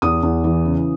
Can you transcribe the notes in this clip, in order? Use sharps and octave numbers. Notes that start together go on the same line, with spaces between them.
E2 D#6
E2
E3
C#3